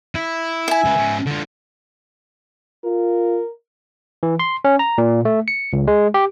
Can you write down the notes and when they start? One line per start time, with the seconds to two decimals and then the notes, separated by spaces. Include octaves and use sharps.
0.15 E4
0.68 E5 G#5
0.84 C#2 B4
0.96 G#2 C#4
1.26 D3 F4
2.84 F4 A#4
4.23 E3
4.39 C6
4.65 C#4
4.79 A#5
4.98 A#2
5.25 A3
5.48 C#7
5.73 C#2
5.87 G#3
6.14 G4